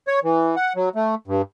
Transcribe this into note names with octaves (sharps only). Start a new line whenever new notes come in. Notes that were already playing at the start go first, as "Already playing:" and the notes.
C#5
E3
F#5
F#3
A3
G2